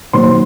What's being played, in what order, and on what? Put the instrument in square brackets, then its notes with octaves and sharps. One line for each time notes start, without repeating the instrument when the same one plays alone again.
[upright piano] D#3 F#3 A#3 C5 C6